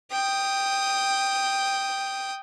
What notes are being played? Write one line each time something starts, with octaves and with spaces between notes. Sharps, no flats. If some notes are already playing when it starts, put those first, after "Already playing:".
G5 D#6